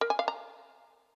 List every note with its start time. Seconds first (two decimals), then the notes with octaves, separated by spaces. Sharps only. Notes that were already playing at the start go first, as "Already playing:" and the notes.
0.01 A#4
0.10 G#5
0.19 F5
0.28 A#5